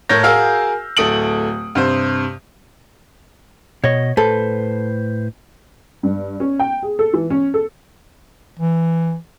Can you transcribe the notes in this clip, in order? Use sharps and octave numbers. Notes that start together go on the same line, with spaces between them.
A2 A#4 C#5 G6 A#6
F#4 G#4 A#4 F5 E6 F6
D1 A3 D#6 D7 F#7
G2 C3 C5
B2 C#5 D#5
A2 A4 B4 C5
G2
C#4
G5
G#4
A4
E3
C#4
A4
E3